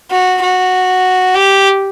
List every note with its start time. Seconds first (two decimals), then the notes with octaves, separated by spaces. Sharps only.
0.11 F#4
0.42 F#4
1.35 G4